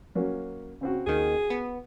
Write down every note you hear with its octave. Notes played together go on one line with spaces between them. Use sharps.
F#3 A#3 C#4
C#3 C4 F#4
D#2 D#3 G#4
B3